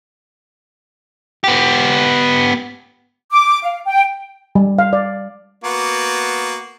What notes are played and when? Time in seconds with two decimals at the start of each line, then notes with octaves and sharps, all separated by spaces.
1.44 B3 G4
3.31 D6
3.63 F5
3.86 G5
4.55 G3
4.79 F5
4.93 D5
5.64 A#3 B3 F#4